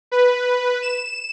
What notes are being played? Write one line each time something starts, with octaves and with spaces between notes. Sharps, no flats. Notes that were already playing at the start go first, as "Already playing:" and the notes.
B4
E7